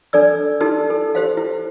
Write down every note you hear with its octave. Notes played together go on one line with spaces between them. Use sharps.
D4 A4 D5 E6
D#4 E4 G4 A4 A5 E6
A4
G4 C5 F5
E4